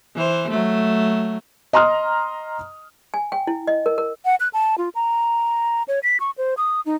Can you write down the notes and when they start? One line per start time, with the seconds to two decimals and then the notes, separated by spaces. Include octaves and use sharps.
0.15 E3 C5
0.50 F#3 A3
1.73 D#5 A#5 C6 D#6 F6
3.14 G#5
3.32 G5
3.47 E4
3.67 D#5
3.86 A#4
3.98 A#4
4.25 F#5
4.40 F#6
4.53 A5
4.78 F4
4.95 A#5
5.88 C#5
6.03 B6
6.20 C#6
6.38 C5
6.57 D#6
6.86 D#4